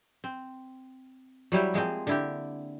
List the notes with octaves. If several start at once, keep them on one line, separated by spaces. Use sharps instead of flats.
C4
F#3 G3 E4 G4
F3 G#3 A#3 C4
D3 E4 G4